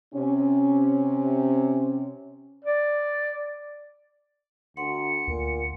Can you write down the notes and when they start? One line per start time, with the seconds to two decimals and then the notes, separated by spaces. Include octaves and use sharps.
0.14 C3 C#4
2.65 D5
4.77 D2 F#5 C6 C#7
5.28 D2 A#2